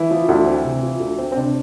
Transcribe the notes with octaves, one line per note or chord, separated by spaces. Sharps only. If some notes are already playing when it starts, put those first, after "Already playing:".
Already playing: E3 E4
F3
D2
C4
C3
F3
D2
C4
C4
C3 D4